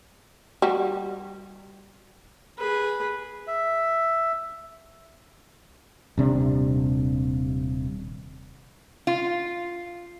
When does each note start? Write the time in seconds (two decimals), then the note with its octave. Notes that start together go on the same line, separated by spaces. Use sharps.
0.62 G3 F#4
2.58 G#4 B4
3.47 E5
6.18 D#1 C3 D4
9.07 F4